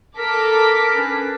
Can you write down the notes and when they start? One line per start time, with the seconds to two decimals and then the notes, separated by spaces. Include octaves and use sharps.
0.17 A4 A#4 D6 B6
0.95 C#4 D4 B4